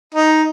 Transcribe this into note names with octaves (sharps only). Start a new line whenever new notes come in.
D#4